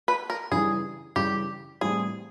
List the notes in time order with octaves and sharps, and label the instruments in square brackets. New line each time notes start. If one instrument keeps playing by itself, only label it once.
[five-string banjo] B4
A#4
[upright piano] C#3 E3 G3 [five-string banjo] G#4
[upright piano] C#3 E3 G3 [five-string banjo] G4
[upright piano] A2 E3 G3 C4 [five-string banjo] G#4